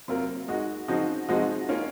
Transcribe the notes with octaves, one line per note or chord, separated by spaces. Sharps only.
C3 F#3 A#3 F4 A#4
G#3 D#4 F#4
C#3 F3 C4 D#4 F#4
C3 F3 G#3 D#4 F#4
A#3 C#4 F4